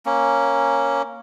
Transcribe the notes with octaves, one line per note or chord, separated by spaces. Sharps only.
A#3 C#4